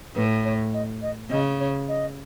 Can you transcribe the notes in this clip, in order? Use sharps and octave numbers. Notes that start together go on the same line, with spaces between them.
A2 B4
C#5
D#5
D#5
C#3 D#5
C#5
D#5